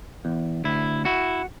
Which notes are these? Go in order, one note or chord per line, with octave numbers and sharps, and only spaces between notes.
E2
D2 E4
E4 F#4